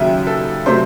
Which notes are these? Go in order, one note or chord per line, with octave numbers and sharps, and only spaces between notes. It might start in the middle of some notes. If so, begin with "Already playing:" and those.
Already playing: D#2 C#3 F#3 E5
A4
C3 F#3 A3 C5